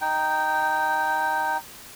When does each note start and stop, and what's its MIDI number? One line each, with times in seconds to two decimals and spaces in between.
0.01 1.57 63
0.01 1.57 79